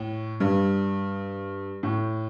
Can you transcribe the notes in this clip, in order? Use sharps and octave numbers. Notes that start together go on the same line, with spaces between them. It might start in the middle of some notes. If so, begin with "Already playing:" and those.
Already playing: A2
G2
A2